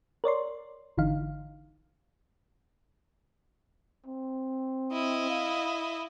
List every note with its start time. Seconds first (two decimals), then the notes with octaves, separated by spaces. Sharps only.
0.24 A#4 C#5 D5 C6
0.97 G#1 D3 E3 D#4 F5
4.07 C4
4.92 E4 D#5
5.30 F5